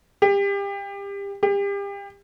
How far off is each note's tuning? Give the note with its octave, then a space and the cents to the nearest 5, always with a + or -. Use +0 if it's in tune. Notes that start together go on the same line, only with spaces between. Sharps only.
G4 +30
G4 +35